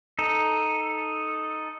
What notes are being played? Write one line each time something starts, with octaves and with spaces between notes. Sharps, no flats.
D#4 A4